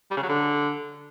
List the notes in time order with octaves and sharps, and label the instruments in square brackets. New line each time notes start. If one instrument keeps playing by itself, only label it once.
[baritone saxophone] G3
C#3
F#3
D3